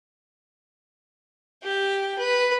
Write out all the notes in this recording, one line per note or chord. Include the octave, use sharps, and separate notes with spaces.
G4 G5
B4